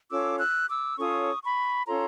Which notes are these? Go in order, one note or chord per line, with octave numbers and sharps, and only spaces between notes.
C#4 F4 A4 C#5 D6 E6
E6 F#6
D6 E6
C#4 F4 A4 C#5 C#6 D#6
B5 C#6
C#4 F4 A4 C#5 A#5 C6